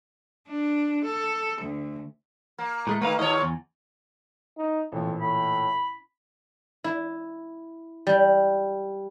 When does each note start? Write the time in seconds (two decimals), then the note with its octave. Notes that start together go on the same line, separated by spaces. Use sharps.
0.48 D4
1.04 A4
1.61 D2
2.58 A#3
2.87 A2 G#3 A3
3.02 D#3 A3 A#3 B4 F5
3.19 D#2 A#2 C#5 D#5
3.42 E2
4.57 D#4
4.92 A1 F2 A#2
5.21 A2 B5
6.84 E4
8.07 G3